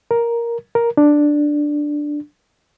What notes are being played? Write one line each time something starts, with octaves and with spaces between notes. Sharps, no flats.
A#4
A#4
D4